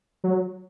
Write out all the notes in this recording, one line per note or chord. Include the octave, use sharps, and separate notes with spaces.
F#3